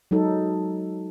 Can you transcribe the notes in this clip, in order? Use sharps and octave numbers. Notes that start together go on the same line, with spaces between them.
F#3 G#3 D#4 A4